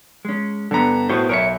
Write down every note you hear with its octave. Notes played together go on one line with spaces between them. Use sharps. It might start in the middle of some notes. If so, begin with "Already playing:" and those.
G#3 C#4
G2 D3 B3 A#5 B5
A2 B3 F#4 C5
B1 A#4 C#5 E5 C#7